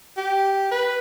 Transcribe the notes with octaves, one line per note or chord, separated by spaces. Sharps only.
G4
B4